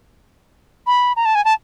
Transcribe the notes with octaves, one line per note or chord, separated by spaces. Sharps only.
B5
A#5
A5
G#5
A5